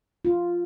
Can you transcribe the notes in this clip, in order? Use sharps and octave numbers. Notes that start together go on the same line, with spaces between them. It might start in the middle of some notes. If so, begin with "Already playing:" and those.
F4